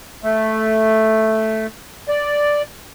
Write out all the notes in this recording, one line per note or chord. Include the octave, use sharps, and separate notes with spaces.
A3
D5